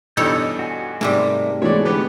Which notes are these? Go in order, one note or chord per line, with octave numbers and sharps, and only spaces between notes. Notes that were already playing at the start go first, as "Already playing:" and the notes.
G2 B2 E3 D#4 A4 C#5 G6
F#4 G#5
G#2 C3 G3 A3 A#4 D6
E3 G#3 A3 B3 F#4 C#5 D5
D3 B3 G4 B4